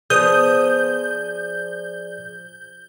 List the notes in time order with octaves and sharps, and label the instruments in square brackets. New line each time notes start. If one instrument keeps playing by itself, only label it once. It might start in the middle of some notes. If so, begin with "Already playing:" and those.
[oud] F3 B3 [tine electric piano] G#4 D5 [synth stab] D#6 [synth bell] G6